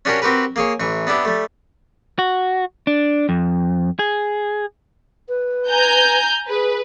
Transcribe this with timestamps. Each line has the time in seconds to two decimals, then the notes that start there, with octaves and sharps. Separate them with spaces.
0.05 C#4 D4 F#4 G4 A#4 C#5
0.22 C4 F#4 G4 A#4 B4
0.56 A#3 G#4 C#5
0.80 A1 E3 C#6
1.07 B3 D4 E4 G4
1.25 G3 A3
2.19 F#4
2.87 D4
3.29 F2
3.99 G#4
5.29 B4
5.68 G#5 A#5 G6
6.49 G#4 B4